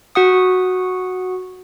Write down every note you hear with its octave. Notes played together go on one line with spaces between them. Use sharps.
F#4 F#5 D#6